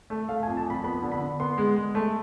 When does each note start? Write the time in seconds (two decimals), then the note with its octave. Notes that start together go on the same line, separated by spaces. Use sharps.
0.10 A3
0.29 A3 F5
0.43 G#5
0.47 F2
0.57 A5
0.66 F2 B5
0.84 B3 B5
1.02 D3
1.12 B5
1.21 D3
1.40 B3 C6
1.58 G#3
1.76 G#3
1.95 A3